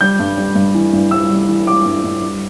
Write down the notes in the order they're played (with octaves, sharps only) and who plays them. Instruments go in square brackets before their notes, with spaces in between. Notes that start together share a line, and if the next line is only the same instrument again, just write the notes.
[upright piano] G3 G6
G2
G3
G2
E3
G2
G3 E6
G3
E3
G3 D6
G2
G2
G3